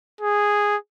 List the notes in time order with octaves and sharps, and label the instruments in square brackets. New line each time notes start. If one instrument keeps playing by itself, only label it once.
[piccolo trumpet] G#4